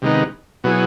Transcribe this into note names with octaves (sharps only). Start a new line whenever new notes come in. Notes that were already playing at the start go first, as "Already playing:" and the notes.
C3 D#3 G#3 B3 D#4
B2 F#3 B3 E4 G#4